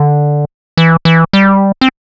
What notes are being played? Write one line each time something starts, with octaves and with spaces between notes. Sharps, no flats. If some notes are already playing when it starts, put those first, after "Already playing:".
Already playing: D3
E3
E3
G3
C4